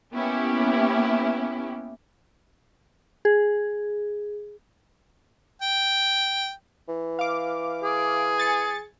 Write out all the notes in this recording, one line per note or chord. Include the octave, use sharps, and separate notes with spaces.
A#3 B3 C#4 E4 G4
G#4
G5
E3
F5 D6
G#4
G#5 A6 C#7